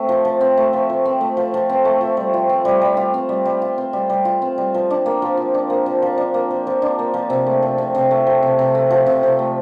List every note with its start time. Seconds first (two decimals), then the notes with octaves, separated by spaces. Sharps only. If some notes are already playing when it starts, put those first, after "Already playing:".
Already playing: A3 C4
0.09 F3
0.25 F3
0.41 C4
0.57 A3
0.73 F3
0.90 F3
1.05 C4
1.21 A3
1.37 F3
1.54 F3
1.69 C4
1.85 A3
2.01 F3
2.17 G3
2.34 F4
2.49 C4
2.65 G3
2.81 G3
2.97 F4
3.14 C4
3.29 G3
3.45 G3
3.62 F4
3.78 C4
3.93 G3
4.10 G3
4.25 F4
4.42 C4
4.58 G3
4.74 F3
4.90 D4
5.06 A#3
5.22 F3
5.37 F3
5.54 D4
5.70 A#3
5.86 F3
6.02 F3
6.18 D4
6.34 A#3
6.51 F3
6.67 F3
6.82 D4
6.99 A#3
7.14 F3
7.30 C3
7.47 A3
7.62 F3
7.78 C3
7.95 C3
8.11 A3
8.27 F3
8.43 C3
8.59 C3
8.75 A3
8.90 F3
9.06 C3
9.23 C3
9.39 A3